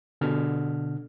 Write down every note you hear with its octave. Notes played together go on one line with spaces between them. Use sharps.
B2 D3 F6